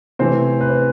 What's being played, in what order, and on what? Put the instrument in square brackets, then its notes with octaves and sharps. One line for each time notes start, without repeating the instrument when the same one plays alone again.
[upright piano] C3 E3 A3 C4 C5
B4
C5